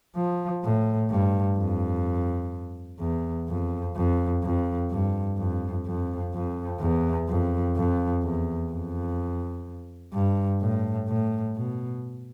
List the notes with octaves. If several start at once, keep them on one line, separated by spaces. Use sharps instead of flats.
F3
A2
G2
F2
E2
F2
F2
F2
G2
F2
F2
F2
E2
F2
F2
E2
F2
G2
A2
A2
B2